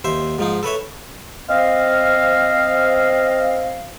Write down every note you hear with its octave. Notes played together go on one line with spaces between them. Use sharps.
D#2 C5 E5
G#2 F3 D#4
A4 B4 C#5 E5
C4 D#5 F5